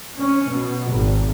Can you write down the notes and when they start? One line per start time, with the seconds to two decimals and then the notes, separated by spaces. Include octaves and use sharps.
0.18 C#4
0.49 B2
0.89 G#1